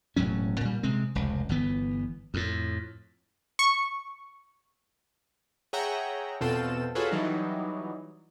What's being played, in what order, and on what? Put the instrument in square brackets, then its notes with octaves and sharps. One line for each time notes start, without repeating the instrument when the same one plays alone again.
[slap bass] E1 A2 F#3 C#4
A#2 G3
C3 G#3 C4
F1 C#2
G1 E3 B3
F2 A2
[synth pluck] C#6
[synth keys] G#4 C#5 E5 F#5 G5 A#5
E2 B2 C4 F4 A4 E7
F4 F#4 G#4 A4 B4 C#5
E3 F#3 G3 D#4